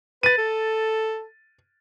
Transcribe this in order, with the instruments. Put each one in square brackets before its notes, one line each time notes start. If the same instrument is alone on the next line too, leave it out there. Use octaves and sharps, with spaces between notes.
[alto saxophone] B4 [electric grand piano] A6 D#7
[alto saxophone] A4